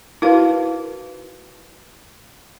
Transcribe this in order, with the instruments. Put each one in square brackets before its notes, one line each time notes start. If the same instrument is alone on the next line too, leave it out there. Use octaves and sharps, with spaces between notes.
[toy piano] D#4 F#4 B4 [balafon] E4 A#4 F5